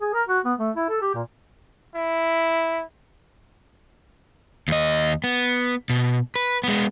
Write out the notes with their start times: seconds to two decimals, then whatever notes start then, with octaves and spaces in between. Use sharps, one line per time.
0.01 G#4
0.14 A#4
0.28 F#4
0.45 B3
0.59 A3
0.76 E4
0.89 A4
1.02 G4
1.15 A#2
1.95 E4
4.68 D#2 D#5
5.24 B3
5.90 B2
6.36 B4
6.64 G#3 B3